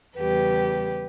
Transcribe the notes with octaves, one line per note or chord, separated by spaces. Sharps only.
E2 C#3 G3 G4 B4